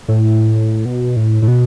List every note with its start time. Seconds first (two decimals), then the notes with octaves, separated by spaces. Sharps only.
0.08 A2
0.85 B2
1.16 A2
1.42 A2
1.48 B2